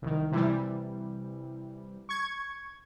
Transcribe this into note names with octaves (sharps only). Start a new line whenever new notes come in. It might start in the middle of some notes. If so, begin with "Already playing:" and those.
C2 D#3
C3 E3 G3
C#6 G#6